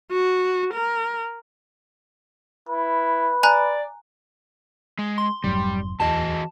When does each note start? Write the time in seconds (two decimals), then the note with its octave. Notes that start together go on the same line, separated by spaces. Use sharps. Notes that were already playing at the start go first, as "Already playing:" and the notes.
0.11 F#4
0.74 A#4
2.69 E4 B4
3.43 D5 G#5 A#5 F#6
4.99 G#3
5.18 C6
5.44 F1 G#2 F#3 G3
6.00 D1 E2 E3 F#4 D#5 A5